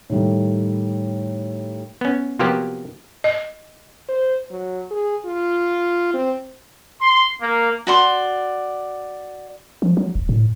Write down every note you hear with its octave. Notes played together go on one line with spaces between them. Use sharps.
A2 D#3 G3 A3
B3 C#4
C3 F3 F#3 A#3 B3 G4
D#5
C5
F#3
G#4
F4
C4
C6
A#3
F#4 D5 C6
F3
F#3
D#1
A2